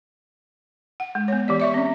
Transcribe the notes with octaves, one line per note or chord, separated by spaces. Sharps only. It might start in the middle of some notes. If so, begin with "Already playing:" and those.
F#5
G#3
B3 C#5
E3 G4 D5
D5 E5 C#6
C4 C#4